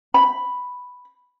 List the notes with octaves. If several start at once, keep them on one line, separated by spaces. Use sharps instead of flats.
B5